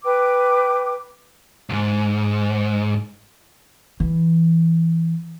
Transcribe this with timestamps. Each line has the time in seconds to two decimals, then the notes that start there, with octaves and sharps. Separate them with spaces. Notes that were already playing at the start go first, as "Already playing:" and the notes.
0.04 B4 G5 D6
1.70 C#2 G#2
4.00 E3